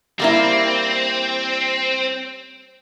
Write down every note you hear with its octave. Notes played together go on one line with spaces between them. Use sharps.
G3 A#3 C4 E4